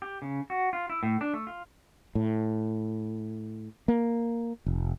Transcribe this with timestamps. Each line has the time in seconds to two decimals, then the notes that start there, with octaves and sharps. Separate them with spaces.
0.02 G4
0.22 C#3
0.50 F#4
0.73 F4
0.90 E4
1.03 A2
1.21 D4
1.34 A3
1.47 F4
2.15 A2
3.88 A#3
4.66 F1